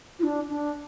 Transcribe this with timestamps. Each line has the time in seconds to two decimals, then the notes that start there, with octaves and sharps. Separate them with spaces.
0.19 F4
0.23 D4
0.49 D4